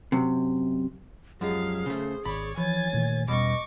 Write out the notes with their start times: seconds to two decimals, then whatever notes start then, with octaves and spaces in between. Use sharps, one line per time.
0.12 F#2 C3
1.41 F#2 F3 G#3 G4 G#4 F5
1.86 C#3 A3 C5
2.26 G#1 C#5 D5 B5
2.57 E3 F3 C#5 G#5 A6
2.93 A#2 D#3 A3
3.28 E1 B2 G3 C#4 D#5 C#6 D6